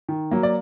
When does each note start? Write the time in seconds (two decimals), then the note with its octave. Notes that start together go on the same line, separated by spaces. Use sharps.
0.08 D#3
0.31 F#3 A#3
0.43 D5